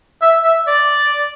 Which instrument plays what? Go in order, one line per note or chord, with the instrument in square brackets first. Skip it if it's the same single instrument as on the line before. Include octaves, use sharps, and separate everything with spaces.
[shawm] E5
E5
D5